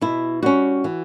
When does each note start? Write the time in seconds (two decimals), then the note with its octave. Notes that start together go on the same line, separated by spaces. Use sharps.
0.01 B2 E4
0.43 G3 C#4 F#4
0.84 E3